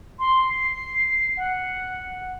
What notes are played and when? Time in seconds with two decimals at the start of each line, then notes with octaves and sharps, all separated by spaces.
0.19 C6
0.49 C7
1.37 F#5